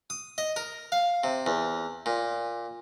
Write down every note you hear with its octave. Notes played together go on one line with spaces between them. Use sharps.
D#6
D#5
A#4
F5
C3
E2
A#2